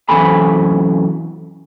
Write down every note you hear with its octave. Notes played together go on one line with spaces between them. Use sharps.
F#2 C3 E3 A4 G#5 B5